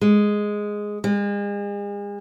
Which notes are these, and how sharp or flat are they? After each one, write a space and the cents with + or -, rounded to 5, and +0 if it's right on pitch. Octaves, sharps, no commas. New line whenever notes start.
G#3 +0
G#3 -40